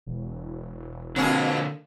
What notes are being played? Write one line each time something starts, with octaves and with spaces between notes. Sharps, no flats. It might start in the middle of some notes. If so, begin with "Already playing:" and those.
E1
F2 B2 D3 A#3 G#4